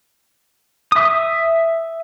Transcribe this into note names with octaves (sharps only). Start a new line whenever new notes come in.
E5 D#6